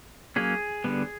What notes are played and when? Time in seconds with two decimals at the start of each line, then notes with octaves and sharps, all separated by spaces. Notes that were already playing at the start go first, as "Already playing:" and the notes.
0.36 F#3 A#3 C#4 G#4
0.84 D3 G3 B3